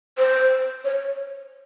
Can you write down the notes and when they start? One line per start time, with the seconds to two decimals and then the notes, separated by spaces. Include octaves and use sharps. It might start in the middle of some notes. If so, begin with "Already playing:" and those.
0.18 C5
0.84 C#5